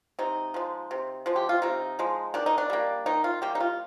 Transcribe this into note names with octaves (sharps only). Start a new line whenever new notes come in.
C3 D#4
F3 G#3
C3
F3 G#3
G4
F4
C3 D#4
F3 G#3
D#3 D4
D#4
D4
G3 A#3
D#3 D#4
F4
G3 A#3 G4
D#4
F4